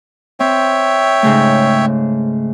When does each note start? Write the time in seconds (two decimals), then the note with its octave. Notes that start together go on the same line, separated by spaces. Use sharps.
0.40 C4 C#5 E5 G5
1.22 G#2 C#3 A3